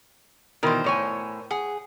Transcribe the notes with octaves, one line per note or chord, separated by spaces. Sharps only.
B2 D#3 E3 A#4 C5
A2 C#5 G#5
G#4 F#5